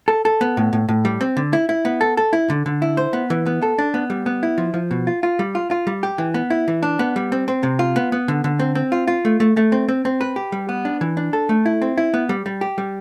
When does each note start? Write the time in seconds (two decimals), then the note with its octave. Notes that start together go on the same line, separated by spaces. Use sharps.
0.08 A4
0.25 A4
0.41 B3
0.57 A2
0.73 A2
0.89 A2
1.05 G3
1.21 C4
1.37 D3
1.53 E4
1.69 E4
1.85 B3
2.01 A4
2.17 A4
2.33 E4
2.50 D3
2.66 D3
2.82 E4
2.97 C5
3.13 B3
3.30 E3
3.46 B3
3.62 A4
3.78 D4
3.94 B3
4.10 G3
4.26 B3
4.43 E4
4.58 F3
4.74 F3
4.91 B2
5.07 F4
5.23 F4
5.39 G3
5.55 F4
5.71 F4
5.87 G3
6.03 G4
6.18 E3
6.34 B3
6.50 E4
6.68 E3
6.83 D4
6.99 B3
7.16 G3
7.32 C4
7.48 C4
7.63 C3
7.79 F4
7.96 B3
8.12 B3
8.28 D3
8.44 D3
8.59 C4
8.75 C4
8.92 F4
9.07 F4
9.25 A3
9.40 A3
9.57 A3
9.72 C4
9.89 C4
10.05 C4
10.21 B4
10.36 G4
10.52 G3
10.69 B3
10.85 D4
11.01 E3
11.17 D4
11.33 A4
11.49 A3
11.66 E4
11.82 C4
11.98 E4
12.14 B3
12.29 G3
12.46 G3
12.61 G4
12.78 G3